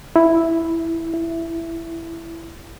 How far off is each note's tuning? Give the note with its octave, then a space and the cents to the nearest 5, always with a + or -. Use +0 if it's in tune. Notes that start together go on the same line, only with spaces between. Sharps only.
E4 +0
E4 +10